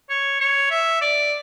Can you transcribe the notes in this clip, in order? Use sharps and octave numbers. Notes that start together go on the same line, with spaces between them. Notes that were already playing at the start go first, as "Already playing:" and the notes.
C#5
C#5
E5
D5